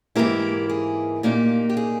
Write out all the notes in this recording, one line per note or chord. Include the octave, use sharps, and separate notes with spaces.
G#2 E3 A#3 E4 G4 A#4
G#4
A#2 A#3 D#4 G4
G4
G#4